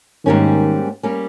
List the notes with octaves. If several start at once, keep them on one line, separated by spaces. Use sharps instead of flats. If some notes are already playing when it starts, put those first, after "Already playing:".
G#2 D#3 G3 A#3 C#4
G3 A#3 C#4